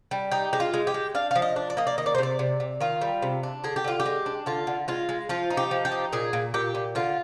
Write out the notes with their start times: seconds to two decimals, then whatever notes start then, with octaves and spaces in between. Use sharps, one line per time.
0.11 G3
0.31 D#4 G4
0.53 G#3 G4
0.60 F4
0.74 G#3
0.87 G4
0.94 G#3
1.15 D4 F5
1.31 F3 F5
1.42 D#5
1.56 D4
1.70 D5
1.77 A#3 D#5
1.87 D5
1.98 D#3 D#5
2.06 D5
2.15 C5
2.18 C3 D5
2.39 C3
2.60 C3
2.81 D#3 F4
3.01 G3
3.22 C3
3.43 D4
3.64 D3 G#4
3.76 G4
3.84 D3 F4
4.00 G4
4.06 G#3
4.26 D4
4.46 D3 F4
4.67 D3
4.88 G#3 F4
5.09 G#3
5.29 F3 F4
5.50 D#4
5.57 G4
5.71 F3
5.85 G4
5.92 D#4
6.13 A#2 G#4
6.33 A#2
6.54 A#2 G4
6.75 A#2
6.95 D3 F4